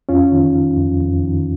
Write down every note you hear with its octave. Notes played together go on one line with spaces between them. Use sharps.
F2 C#4 F4
D#3
D#3
F2
F2
D#3